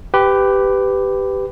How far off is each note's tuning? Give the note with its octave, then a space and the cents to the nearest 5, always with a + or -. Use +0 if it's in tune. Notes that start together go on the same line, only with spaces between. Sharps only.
G4 +0 B4 +20